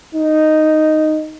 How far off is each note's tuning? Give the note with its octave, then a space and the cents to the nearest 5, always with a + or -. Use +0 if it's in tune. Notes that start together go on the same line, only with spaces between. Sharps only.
D#4 -5